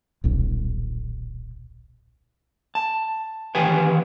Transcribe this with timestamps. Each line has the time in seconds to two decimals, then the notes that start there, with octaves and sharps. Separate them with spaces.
0.24 D#1 B1
2.75 A5
3.55 D#3 E3 G4 B4 G5 G#5